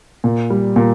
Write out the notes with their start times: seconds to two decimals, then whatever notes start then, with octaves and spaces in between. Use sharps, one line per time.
0.24 A#2
0.50 G3
0.76 A#2